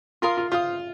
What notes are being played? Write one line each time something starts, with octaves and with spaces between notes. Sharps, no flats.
F4 A#4 F5 C6 D#6
F4
F4 C5 F5 D#6